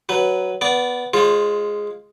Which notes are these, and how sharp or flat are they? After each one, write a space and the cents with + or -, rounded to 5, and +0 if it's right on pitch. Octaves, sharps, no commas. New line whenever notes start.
F#3 +10 B4 +0
B3 +0 D5 -15
G#3 +0 F4 +0 C5 +45